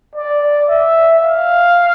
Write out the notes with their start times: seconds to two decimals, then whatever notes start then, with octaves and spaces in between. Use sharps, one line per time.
0.15 D5
0.69 E5
1.23 F5